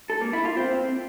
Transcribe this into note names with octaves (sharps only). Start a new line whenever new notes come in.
A4
A#3
E4
F4
C4